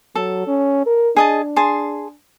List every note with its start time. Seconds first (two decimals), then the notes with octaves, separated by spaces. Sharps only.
0.16 F#3 A4
0.47 C#4
0.86 A#4
1.17 D4 G#4 D#5 A5
1.56 G#4 A5 C6